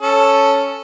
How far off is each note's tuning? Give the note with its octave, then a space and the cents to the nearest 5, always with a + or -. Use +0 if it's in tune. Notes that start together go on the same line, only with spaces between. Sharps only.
C#4 +0 A4 +0